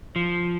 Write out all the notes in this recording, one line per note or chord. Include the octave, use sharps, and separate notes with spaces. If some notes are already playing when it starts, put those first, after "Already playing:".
F3